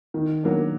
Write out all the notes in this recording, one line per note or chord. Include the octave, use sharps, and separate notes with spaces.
D#3
F#3 A#3 D4